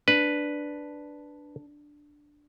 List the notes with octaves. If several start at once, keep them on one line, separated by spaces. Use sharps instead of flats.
D4 B4